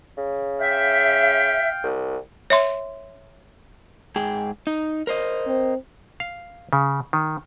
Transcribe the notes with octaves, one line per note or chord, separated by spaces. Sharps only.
C#3
E5 F5 G5
C2
C#5 E5 C6
G#2 G#4 G5
D#4
A#4 C5 D#5
C4
F5
C#3
D#3